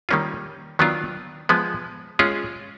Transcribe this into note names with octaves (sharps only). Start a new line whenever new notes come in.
D#3 G3 A#3 C#4 F4
D#3 F#3 B3 D4 F4
F3 G#3 B3
G#3 C#4 F4 G#4